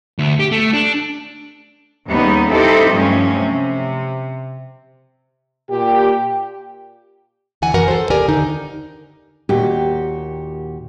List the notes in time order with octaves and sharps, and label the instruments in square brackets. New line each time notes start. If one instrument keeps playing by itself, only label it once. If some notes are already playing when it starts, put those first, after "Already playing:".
[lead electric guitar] D2
G4
A3
D4
[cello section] D#2 C#3 G3 B3 D#4
C4 D#4 E4 G4 A4
G2 F3 F#3 A3 C#4
C3
[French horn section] A#2 G4
[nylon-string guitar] D2 E3 F#5 G#5
F#2 E3 F#4 A#4 F#5
A4 C5
D#2 G4 A#4 D5 G#5
D3 D#3 D#4
[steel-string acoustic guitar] D#2 A#2 F#4 G4